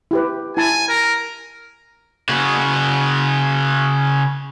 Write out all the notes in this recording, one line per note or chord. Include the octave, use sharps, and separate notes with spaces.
E4 G4 B4
E4 G#5 A5
A#4
C#3 F#4